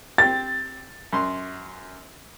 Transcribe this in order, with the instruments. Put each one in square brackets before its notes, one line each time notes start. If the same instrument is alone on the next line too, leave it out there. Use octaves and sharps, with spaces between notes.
[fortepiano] C4 G4 [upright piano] A6
[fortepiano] F#2 C6